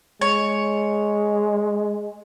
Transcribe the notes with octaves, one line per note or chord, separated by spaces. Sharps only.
G#3 C#5